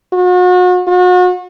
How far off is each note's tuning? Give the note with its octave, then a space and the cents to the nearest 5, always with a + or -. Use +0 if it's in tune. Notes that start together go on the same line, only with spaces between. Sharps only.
F#4 -40
F#4 -35